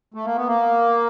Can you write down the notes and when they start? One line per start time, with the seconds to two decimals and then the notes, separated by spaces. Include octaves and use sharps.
0.14 A3
0.25 A#3
0.36 B3
0.47 A#3